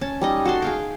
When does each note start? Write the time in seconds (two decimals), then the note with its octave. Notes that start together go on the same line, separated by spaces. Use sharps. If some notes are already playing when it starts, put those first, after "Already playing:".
0.01 C#4 A5
0.21 G3 D#4 D#5
0.45 F#4 A4 A5 C6
0.62 G#4 F5 G5